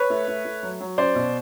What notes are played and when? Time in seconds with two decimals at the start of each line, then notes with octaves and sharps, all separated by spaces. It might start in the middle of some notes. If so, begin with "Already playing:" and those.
Already playing: B4 C#5
0.10 A3
0.28 A3
0.45 A3
0.63 F#3
0.81 F#3
0.98 C#4 C5 D5
1.15 B2